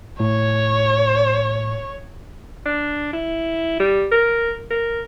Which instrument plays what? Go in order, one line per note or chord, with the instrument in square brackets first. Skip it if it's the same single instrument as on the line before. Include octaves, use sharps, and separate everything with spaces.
[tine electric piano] A2 [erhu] C#5
[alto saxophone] D4
E4
G3
A#4
A#4